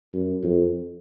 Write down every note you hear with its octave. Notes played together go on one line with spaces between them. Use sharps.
F#2
F2